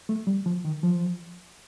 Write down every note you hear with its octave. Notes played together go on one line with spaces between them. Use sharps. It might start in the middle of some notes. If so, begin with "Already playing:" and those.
A3
G3
F3
D#3
F3